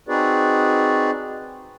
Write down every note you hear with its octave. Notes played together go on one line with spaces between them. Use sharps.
C4 D#4 F#4 G#4 B4 D5